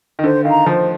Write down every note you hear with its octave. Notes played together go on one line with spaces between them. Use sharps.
D#3
D3 C5
D#3 F5 A#5
F3 C5